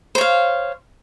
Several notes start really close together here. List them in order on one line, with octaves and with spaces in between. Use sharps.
C5 C#5 F5